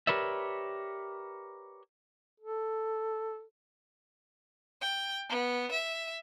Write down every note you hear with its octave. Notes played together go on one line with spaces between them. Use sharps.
G4 A#4 B4 C#5 D5 E5
A4
G5
B3
E5